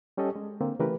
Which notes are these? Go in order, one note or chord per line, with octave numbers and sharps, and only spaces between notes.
G3 C#4 G4 A4 D#5
G#3
D3 A#3 C4
C#3 E3 A3 G4 A#4 B4